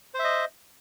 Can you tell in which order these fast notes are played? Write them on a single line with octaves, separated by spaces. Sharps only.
C5 E5 D#5